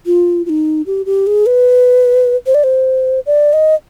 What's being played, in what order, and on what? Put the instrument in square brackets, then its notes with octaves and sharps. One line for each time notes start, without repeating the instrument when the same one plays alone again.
[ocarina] F4
F4
D#4
G4
G4
G#4
B4
C5
D5
C5
D5
D#5